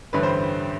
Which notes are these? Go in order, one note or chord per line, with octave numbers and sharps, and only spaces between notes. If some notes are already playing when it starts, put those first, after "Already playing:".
A1 G2 D3 B4
C5